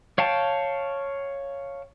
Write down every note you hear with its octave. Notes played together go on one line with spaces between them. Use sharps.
C#5 F5 G5 A5